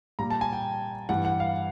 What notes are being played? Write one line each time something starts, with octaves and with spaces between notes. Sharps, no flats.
A#2 G3 A#5
A5
G#5
G5
G2 E3 G3 F#5
F#5
F5